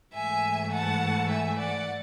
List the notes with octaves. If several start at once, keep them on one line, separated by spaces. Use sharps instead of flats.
G#2 E3 A3 E5 G#5
F#5 A5
E5 G#5
D5 F#5